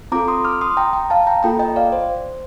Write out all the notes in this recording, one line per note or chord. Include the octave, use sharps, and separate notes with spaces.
C4 F4 A4 A#5 D6
C6 D#6
D6 F6
C6 D#6
G5 A#5
G5 A#5
F5 A5
G5 A#5
A#3 F4 A4 G5 A#5
D#5 G5
D5 F5
C5